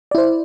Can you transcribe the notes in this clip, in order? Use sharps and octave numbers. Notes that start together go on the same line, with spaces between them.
E4 C5 D5